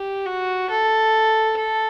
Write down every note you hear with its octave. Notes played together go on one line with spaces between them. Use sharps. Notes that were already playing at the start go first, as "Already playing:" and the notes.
Already playing: G4
F#4
A4
A4